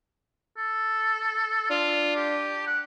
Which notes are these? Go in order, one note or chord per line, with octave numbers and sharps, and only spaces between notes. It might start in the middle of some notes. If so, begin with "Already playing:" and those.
A4
D4 F4
G4
F#5